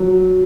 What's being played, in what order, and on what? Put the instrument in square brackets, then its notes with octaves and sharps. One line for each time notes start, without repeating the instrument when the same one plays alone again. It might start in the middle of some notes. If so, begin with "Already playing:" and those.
Already playing: [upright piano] F#3